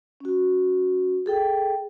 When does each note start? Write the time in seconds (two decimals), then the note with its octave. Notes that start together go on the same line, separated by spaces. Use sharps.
0.20 C#4 F#4
1.26 G#4 A4 G5